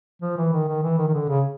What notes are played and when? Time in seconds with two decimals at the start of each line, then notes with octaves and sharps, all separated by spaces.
0.22 F3
0.37 E3
0.53 D#3
0.68 D#3
0.83 E3
0.98 D#3
1.08 D#3
1.14 D3
1.28 C#3